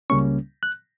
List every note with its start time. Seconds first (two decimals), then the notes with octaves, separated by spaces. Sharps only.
0.10 C#2 C#3 G3 A#3 C#4 C#6
0.63 F#6